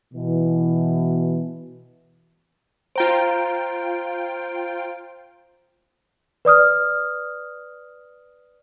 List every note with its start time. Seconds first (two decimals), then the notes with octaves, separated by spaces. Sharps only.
0.13 B2 E3
2.96 F4 C5 G5 A#5 D7
6.45 B4 D5 D#6 F6